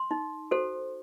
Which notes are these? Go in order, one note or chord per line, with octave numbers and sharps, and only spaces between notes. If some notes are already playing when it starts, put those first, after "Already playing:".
Already playing: C6
D#4
F#4 A4 C5